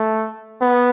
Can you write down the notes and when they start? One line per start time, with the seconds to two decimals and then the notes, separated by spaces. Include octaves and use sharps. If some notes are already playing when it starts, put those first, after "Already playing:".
Already playing: A3
0.61 B3